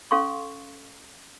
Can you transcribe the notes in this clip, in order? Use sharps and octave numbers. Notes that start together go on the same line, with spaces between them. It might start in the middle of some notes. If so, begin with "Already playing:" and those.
C#4 A4 F5 C6 C#6